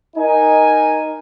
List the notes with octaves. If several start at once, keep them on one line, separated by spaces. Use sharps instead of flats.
D#4 A#4 G#5